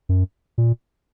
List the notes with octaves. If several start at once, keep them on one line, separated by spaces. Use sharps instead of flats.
F#2
A#2